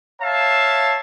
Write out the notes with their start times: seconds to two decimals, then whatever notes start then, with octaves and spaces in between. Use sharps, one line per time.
0.21 C#5 E5 F5 A5